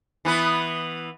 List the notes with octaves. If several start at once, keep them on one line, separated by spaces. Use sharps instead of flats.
E3 B3 B4